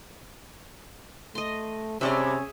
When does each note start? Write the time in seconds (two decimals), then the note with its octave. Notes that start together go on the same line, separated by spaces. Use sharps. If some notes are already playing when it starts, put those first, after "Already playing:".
1.35 A3 D#5 C6
2.01 G2 C3 C#4 F4 G#4 C#5 D5 E5